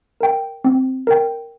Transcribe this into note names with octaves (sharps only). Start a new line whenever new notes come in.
A#4 G5
C4
A#4 G5